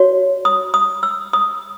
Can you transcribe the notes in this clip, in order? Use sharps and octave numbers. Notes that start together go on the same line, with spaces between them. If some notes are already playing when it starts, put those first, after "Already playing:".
Already playing: F#4 C#5
D#6
D#6
E6
D#6